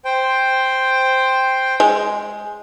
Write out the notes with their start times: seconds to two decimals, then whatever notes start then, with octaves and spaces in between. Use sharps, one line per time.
0.05 C5 G5
1.80 G#3